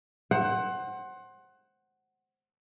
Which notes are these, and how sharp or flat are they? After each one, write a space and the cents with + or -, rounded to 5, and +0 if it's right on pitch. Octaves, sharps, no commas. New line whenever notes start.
C5 +25 F#5 +15